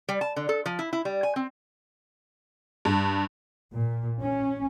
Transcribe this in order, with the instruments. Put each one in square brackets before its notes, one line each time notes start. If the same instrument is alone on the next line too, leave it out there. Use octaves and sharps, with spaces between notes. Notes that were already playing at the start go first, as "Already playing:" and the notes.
[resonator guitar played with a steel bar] G3
A5
D3
A4
F3
E4
E4
G3
G#5
C4
[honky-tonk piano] G2
[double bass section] A#2
C#4